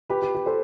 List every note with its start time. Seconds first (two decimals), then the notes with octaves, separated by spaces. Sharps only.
0.10 G4 B4
0.22 G4
0.35 G4
0.46 A4 C5